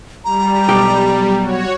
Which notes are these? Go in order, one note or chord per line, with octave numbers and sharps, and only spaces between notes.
G3 A#5
B1 G4
F#4 C#5